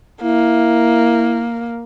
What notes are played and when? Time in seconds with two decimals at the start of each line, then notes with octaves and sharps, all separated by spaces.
0.23 A#3 E4